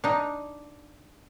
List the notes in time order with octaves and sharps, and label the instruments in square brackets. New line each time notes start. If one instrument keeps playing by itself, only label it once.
[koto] D4 D#4